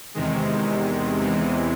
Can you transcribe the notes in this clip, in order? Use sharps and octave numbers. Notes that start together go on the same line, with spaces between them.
E2 C3 D#3 G#3
E2 C3 E3 G#3